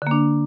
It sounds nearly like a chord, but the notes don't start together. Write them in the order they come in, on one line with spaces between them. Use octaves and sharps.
D3 A#3 D4